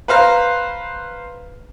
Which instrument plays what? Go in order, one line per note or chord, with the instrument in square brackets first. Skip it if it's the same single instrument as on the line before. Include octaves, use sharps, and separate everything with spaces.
[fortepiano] B4 C5 F5 A#5